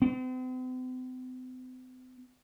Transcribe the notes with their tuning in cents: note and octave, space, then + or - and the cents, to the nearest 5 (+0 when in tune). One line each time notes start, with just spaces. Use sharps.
C4 -45